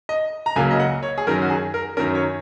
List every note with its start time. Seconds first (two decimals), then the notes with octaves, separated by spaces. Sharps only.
0.09 D#5
0.46 A#5
0.56 C#2 C#3 F#3 A#3 G#5
0.71 D#5
0.80 F#5
1.03 C#5
1.18 G#4
1.27 F#2 D#3 F#3 C#4 A#4
1.42 F#4
1.50 G#4
1.74 A#4
1.97 F#2 D#3 F#3 C#4 A#4
2.15 C#5